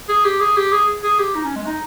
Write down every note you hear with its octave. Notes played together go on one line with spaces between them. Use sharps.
G#4
G4
G#4
G4
G#4
G#4
G4
D#4
C#4
G#3
D#4